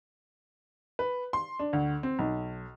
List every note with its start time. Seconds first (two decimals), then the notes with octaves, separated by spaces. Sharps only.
0.99 B4
1.33 C6
1.59 D4
1.73 D2
2.03 C4
2.19 B1